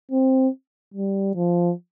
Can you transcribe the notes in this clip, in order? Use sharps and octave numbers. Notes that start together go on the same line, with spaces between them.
C4
G3
F3